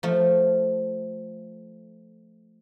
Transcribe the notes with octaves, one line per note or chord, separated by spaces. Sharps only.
F3 A3